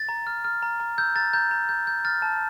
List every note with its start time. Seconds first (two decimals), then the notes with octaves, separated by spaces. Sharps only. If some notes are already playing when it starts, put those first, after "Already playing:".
Already playing: A6
0.09 A#5
0.27 F6
0.44 F6
0.62 A#5
0.80 A#5
0.98 E6 G6
1.15 A#5 A6
1.33 A#5 G6
1.51 A#5
1.69 G6
1.87 G6
2.05 F6 A6
2.22 A5